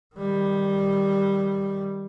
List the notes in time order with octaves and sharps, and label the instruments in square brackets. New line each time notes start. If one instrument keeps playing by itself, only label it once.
[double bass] D#3 G3